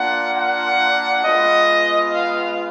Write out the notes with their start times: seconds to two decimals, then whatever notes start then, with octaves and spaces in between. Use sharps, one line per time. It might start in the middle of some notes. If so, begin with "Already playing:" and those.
Already playing: A#3 D4 F4 F#5
0.35 F#5
1.23 G#3 B3 F4 D#5
2.11 F5